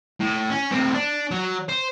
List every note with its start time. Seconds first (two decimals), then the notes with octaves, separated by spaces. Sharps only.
0.20 A2
0.50 C#4
0.71 A2 C4
0.94 D4
1.31 F#3
1.69 C5